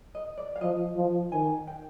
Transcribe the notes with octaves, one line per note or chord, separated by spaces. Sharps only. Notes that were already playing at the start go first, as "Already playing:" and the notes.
D#5
D5
F5
F3 D#5
F3
D#3 G#5
G5